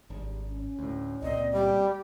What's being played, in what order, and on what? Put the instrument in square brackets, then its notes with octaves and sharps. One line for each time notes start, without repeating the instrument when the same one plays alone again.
[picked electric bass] G#1 [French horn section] G3 D4
[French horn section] C#4
[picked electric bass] D2 A2
[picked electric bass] C#2 A#2 C4 [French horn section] D5 [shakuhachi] D#5
[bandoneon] G3 [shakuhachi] G4